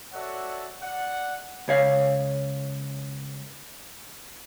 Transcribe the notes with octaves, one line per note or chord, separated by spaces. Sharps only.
F#4 A4 C#5 D5 E5 F#5
D5 F#5
C#2 C#5 F5